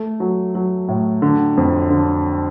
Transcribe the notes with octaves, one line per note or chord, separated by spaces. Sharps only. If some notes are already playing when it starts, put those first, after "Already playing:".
Already playing: A3
F#3
F#3
A2
D3
F2
D3